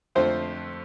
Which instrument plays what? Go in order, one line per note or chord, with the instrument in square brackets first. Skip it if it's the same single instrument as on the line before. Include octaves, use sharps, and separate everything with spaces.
[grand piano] F2 D3 A3 C4 F4 [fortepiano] C5